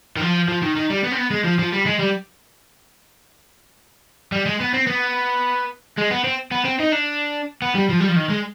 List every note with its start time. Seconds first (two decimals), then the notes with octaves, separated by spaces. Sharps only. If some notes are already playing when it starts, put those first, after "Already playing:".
0.16 D#3
0.21 F3
0.49 F3
0.63 D#3
0.76 D#3
0.90 G3
1.04 B3
1.12 C4
1.17 B3
1.31 G#3
1.44 F3
1.59 F3
1.72 G3
1.86 G#3
1.99 G3
4.32 G3
4.46 G#3
4.61 B3
4.74 C4
4.87 B3
5.98 G#3
6.11 B3
6.24 C4
6.52 B3
6.65 C4
6.80 D#4
6.92 D4
7.62 B3
7.75 G3
7.89 F3
8.00 G3
8.08 F3
8.16 D#3
8.30 G#3